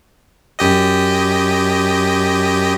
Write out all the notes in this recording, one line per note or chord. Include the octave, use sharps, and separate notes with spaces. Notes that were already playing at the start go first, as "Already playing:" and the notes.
F#2 G4 D#5